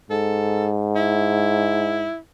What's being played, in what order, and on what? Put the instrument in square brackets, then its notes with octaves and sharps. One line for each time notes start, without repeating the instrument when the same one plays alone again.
[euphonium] G#2 [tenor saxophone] A4
[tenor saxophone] E4